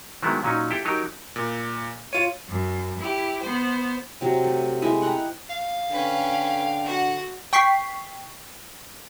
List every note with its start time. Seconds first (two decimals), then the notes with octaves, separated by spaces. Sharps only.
0.23 D#3 F#3 G#3 A3 B3 E4
0.43 A#2 F#3 C#4 D#4
0.71 E4 G4 A4 G5
0.85 F#3 D#4 G4 A#4
1.36 A#2
2.13 F4 C#5 D#7
2.47 F#2
2.98 E4 G4
3.41 B3 C5
4.21 C3 F#3
4.44 A3
4.82 G#3 A3 E4 D#5
5.02 F#5 G5 A#5 B5
5.50 F5
5.91 D3 C#4 B4 G5
6.84 F#4 F#5
7.53 G5 C#6 B6 C7